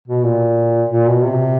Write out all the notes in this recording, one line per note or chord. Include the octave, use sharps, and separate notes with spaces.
B2
A#2
A#2
B2
C3